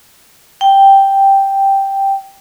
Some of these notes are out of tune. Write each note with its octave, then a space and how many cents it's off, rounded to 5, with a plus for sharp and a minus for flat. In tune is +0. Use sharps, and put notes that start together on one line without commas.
G5 +0